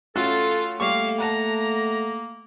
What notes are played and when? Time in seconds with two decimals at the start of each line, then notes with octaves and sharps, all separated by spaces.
0.16 A3 C#4 F4 F#4 A4
0.80 G3 A3 A#3 F5 C#6
1.20 F#5 A5 A#5